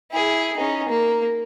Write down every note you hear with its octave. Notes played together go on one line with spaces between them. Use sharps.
E4 G#4
C#4 D#4
A#3